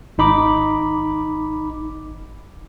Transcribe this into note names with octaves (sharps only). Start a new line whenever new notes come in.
G#1 D#4 B5 D6